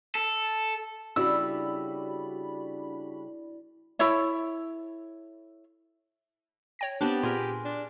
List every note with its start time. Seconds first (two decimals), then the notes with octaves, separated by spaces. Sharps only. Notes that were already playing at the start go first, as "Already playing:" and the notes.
0.15 A4
1.16 C#3 G3 D4 E4 F#4 D5 B5 E6
3.99 E4 A4 C#5 E5
6.79 C#5 G5 A#6
7.01 B3 C4 D4 G4 A5
7.23 A#2 G#4 A#4 B4 C6
7.65 D4